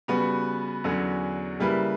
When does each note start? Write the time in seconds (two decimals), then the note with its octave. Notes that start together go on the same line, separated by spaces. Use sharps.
0.08 C#3 G3 B3 F#4 B4
0.84 E2 D3 F#3 C#4 F#4
1.60 C#3 G3 A#3 E4 B4